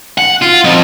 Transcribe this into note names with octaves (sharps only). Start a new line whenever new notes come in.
F#5
F4
F2